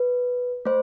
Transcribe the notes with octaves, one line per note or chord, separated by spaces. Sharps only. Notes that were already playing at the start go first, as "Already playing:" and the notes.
Already playing: B4
A3 C5